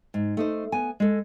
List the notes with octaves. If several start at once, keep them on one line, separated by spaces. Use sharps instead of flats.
G#2
A3 D#4 C5
B3 G#5
G#3 A4